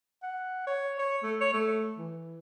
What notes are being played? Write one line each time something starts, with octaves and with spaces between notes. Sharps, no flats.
F#5
C#5
C#5
A3
C#5
A3
E3